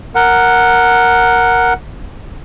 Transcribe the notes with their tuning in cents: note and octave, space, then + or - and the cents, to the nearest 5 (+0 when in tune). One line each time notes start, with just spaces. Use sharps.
A#4 +0 F#5 +0